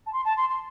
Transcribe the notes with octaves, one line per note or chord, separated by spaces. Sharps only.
A5
C6
A5
C6
C6